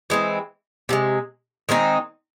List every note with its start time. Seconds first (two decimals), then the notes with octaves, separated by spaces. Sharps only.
0.10 E3 G#3 C4
0.89 C3 F3 G#3
1.69 D#3 G#3 C4 D#4